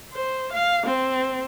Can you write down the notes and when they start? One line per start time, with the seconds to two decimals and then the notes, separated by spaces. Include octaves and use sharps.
0.14 C5
0.53 F5
0.87 C4